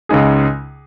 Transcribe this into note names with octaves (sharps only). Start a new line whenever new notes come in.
C#2 C#3 G#3 D#4 G#4